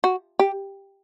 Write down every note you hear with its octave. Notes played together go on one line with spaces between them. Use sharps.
F#4
G4